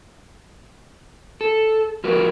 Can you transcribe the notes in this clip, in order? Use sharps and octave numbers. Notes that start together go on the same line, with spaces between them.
A4
F3 G#3 F#4 A#4 B4